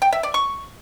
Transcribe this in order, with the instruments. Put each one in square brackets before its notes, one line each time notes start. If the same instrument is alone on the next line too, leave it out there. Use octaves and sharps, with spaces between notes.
[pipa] G5
E5
D5
C#6